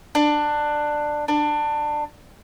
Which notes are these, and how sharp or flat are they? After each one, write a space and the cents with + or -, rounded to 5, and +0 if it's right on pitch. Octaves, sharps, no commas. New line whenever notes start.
D4 +15
D4 +20